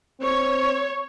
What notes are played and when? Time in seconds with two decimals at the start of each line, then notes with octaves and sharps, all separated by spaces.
0.21 C4 C#5